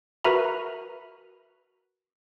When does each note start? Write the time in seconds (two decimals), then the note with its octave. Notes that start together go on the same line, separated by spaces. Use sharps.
0.24 F#4 A#4 B4 E5 A#5 B5